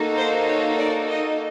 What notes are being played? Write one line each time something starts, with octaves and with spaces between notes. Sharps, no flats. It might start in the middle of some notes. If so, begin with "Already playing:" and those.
Already playing: A#3 D#4 F#4 A4
C5
C#5
D5
D#5